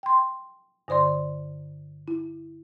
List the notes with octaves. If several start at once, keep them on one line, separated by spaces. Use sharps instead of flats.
G5 C6
G2 D3 C5 D5 C6
E4